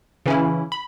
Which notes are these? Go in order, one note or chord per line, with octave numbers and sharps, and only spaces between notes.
C#3 E3 C#4 E4
B5